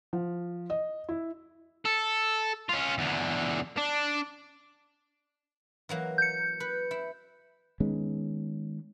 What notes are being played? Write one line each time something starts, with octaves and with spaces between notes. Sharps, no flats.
F3
D#5
E4
A4
C#4 F4
E2 D3
D4
E3 F#3 A#3
G6 C#7
B4
E4
D#3 G#3 B3 C#4